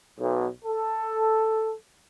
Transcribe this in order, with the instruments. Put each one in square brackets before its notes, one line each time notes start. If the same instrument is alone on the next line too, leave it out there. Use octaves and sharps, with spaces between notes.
[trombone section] B1
A4